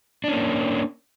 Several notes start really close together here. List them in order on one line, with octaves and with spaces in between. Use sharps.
D4 C#4 A#3